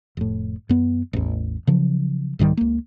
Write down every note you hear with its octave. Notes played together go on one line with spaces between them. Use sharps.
F1 A2
F#2 B3
A1 E2
C#3 F3 F#3
C2 G#2 D#3 G3
C#2 A#3